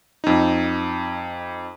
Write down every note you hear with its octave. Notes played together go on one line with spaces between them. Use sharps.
F2 D#4